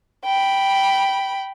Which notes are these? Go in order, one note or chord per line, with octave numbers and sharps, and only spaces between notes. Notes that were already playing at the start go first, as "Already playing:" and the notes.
G5 B5